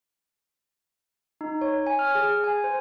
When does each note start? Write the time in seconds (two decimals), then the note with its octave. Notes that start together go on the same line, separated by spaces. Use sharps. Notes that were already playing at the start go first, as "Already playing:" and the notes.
1.41 D#4
1.61 C#5
1.87 G#5
1.99 F6
2.15 G#4
2.44 G#5
2.64 C5